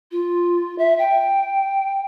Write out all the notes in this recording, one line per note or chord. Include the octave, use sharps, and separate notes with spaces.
F4
E5
G5